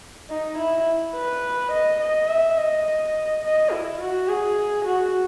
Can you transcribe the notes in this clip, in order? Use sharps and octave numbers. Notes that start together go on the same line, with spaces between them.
D#4
E4
B4
D#5
D#5
E5
D#5
D#5
E4
F#4
G#4
F#4